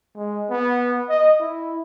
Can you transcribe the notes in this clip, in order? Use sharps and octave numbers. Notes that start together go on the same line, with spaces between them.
G#3
B3
D#5
E4